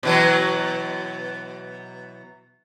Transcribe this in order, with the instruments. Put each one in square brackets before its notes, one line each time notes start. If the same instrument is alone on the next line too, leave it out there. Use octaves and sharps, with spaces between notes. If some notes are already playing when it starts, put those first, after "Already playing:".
[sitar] B2 E3 F#3